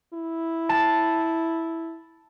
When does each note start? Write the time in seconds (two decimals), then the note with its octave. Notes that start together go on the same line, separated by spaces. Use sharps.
0.14 E4
0.69 A5